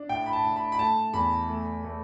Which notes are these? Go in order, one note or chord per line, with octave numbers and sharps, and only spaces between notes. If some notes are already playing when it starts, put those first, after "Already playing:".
Already playing: D4
A2 G5
B5
A5
A2
B5
B5
A3 A5
E2 B5
A3
A3